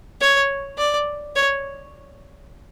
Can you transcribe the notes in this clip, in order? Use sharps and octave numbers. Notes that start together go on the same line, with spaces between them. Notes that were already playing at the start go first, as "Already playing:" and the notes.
C#5
D5
C#5